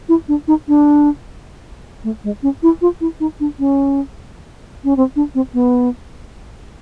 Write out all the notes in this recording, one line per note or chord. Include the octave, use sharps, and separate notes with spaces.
E4
D4
D#4
D4
A3
G#3
C#4
E4
F4
E4
D#4
D4
C#4
C#4
C4
D4
C4
B3